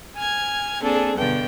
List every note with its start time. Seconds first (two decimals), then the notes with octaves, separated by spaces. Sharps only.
0.15 G#5 F6 G#6
0.80 A#3 C4 D4 G#4 A4
1.16 G2 B2 D3 G5